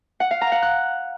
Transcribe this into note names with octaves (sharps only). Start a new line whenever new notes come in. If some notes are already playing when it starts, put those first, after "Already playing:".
F#5
F5
A#5
F#5
F#6